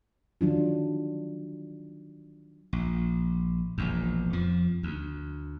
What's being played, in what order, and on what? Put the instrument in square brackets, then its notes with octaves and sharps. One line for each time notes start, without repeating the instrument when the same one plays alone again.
[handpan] D#3 F#3 D4 F4
[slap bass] A#1
E1 A#1 E2
F2 F3
D2